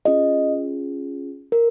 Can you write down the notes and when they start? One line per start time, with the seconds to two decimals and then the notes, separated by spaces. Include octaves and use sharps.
0.05 C#4 F4 G#4 D#5
1.52 A#4